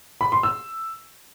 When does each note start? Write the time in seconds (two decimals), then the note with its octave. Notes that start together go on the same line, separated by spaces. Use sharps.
0.21 B5
0.32 C6
0.43 E6